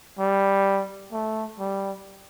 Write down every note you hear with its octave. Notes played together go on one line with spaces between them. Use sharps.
G3
A3
G3